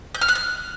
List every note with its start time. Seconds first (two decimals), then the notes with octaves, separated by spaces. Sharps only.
0.15 G6
0.21 F6
0.28 F#6
0.35 F6